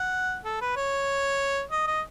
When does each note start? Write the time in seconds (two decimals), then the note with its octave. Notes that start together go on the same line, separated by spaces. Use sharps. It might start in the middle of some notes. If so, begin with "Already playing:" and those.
Already playing: F#5
0.45 A4
0.61 B4
0.77 C#5
1.71 D#5
1.87 D#5